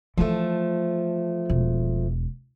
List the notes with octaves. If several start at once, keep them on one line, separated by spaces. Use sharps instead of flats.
E3 F3 A3 F4
E1